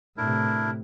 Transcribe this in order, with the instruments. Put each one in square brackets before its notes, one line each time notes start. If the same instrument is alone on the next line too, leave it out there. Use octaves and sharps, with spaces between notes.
[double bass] A2 C3 [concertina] D4 E4 A#4